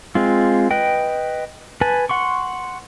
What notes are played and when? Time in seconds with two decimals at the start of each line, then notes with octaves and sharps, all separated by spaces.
0.15 G#3 C4 F4
0.71 B4 D#5 G5
1.81 B4 G#5 A5
2.09 F#5 C6 C#6